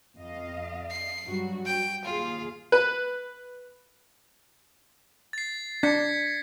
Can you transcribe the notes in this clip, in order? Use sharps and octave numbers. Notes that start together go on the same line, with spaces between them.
F2 D#5 F5
C7
G2 F#3 F#4
G5
D#2 F4 G#4 F5
B4
A6 C7
D4 G#6 B6 C#7